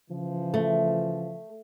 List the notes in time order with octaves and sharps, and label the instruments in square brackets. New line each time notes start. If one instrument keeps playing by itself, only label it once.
[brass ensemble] C#3 E3 F3
[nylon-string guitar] A3